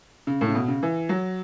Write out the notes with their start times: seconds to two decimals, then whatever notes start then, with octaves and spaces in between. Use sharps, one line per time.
0.27 C#3
0.41 A2
0.48 C#3
0.55 B2
0.68 C#3
0.83 E3
1.09 F#3